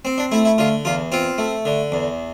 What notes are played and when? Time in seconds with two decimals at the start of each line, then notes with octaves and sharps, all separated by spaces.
0.05 C4
0.18 D4
0.32 A3 E4
0.45 E4
0.58 D3 F4
0.85 E2 F4
1.12 C4 F4
1.38 A3
1.65 D3
1.92 E2